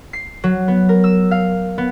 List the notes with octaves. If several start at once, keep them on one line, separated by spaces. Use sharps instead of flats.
C7
F#3
B3
A#4
E6
F5
B3